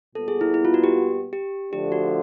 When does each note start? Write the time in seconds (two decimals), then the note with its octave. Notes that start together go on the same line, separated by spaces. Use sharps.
0.15 A#2 G3 B3 A4
0.28 G#4
0.41 E4
0.54 E4
0.65 F4
0.74 F#4
0.84 G4
1.33 G4
1.73 D3 F3 A3 D4 G4
1.92 F#4